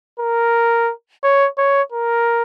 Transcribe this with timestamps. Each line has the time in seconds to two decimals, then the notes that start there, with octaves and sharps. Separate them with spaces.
0.20 A#4
1.24 C#5
1.58 C#5
1.92 A#4